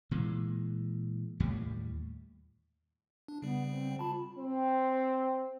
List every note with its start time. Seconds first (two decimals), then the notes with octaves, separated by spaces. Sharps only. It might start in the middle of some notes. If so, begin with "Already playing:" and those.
0.11 A#2 E3 G#3
1.40 D#2 A2 G3
3.28 D4
3.42 C#3 G3 B3
3.70 C4
3.99 F4 A5 B5
4.37 C4